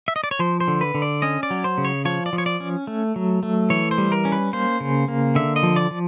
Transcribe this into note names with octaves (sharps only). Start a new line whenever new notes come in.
E5
D#5
D5
C#5
F3 C5
C5
D3
B4
D3
D5
C#4 D#5
D5
F#3
C5
C#3
C#5
F3 C#5
D5
F3
C#5
D5
C#4
A3
F#3
A3
E3 C#5
C5
G3
A#4
C#4
B4
A#3 C5
C#3
A#3
D3 E5
D#5
F3
D5
F3